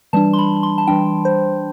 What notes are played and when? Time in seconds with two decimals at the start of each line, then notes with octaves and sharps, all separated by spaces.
0.13 E3 G3 D4 A5
0.33 C6
0.38 B5
0.63 C6
0.78 A5
0.87 E3 G3 D4 G5
1.25 C5